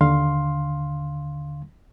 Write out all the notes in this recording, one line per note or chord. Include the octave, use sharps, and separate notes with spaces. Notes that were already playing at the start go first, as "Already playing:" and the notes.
D#2 D3 F5 C6